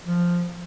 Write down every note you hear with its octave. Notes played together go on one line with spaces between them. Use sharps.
F3